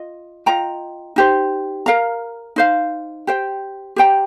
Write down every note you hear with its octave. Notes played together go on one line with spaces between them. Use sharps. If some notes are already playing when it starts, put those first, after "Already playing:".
Already playing: F4 D#5
F4 D#5 G5 A#5
D#4 G4 C5
A#4 F5 A#5
D#4 C5 F5
G4 C5 G5
G4 C5 G5 A#5